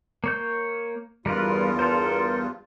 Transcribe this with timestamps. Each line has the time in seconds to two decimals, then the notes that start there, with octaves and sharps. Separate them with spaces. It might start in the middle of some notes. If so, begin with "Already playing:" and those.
0.24 A#3 C#5 G6
1.26 E2 G2 G3 F4 A#4 B4
1.79 A4 A#4 C5